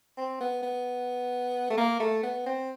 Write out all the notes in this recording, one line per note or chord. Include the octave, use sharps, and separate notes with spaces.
C4
B3
B3
A3
A#3
A3
B3
C4